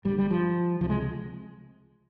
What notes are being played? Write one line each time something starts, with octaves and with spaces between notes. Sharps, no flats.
G1 G2 G3
G3
F3
C#2 C3 F3
G#3